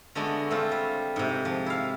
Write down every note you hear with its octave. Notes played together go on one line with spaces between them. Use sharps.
D3 G#3 A3 B3 D4 F#4
A3 C4 F4
G3
G#2 C3
F3
E4 F5